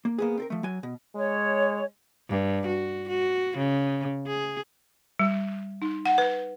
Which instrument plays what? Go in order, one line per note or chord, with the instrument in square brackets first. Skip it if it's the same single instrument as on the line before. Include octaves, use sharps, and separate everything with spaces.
[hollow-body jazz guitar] A#3
A#3 B3 G#4
C4 A4 A#4
F3 A3
F#3 G#5
B2
[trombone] G#3 [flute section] C#5
[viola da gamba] G2
F#4
F#4
C#3
G#4
[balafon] G3
D#4
F#5
B4